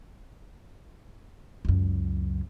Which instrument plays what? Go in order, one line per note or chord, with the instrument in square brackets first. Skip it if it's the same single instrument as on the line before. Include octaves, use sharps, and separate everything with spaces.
[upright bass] C#2 F#2